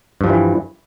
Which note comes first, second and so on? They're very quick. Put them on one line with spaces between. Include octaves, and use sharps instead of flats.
G2 F3 G3 E3